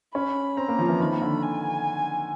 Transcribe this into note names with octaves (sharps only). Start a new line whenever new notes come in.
C#4 B5
C4 A#5
A#3
F3
E3
D#3 B5
D3
G#5